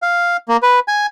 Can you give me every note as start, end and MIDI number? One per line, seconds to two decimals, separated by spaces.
0.02 0.37 77
0.48 0.57 58
0.62 0.80 71
0.88 1.06 80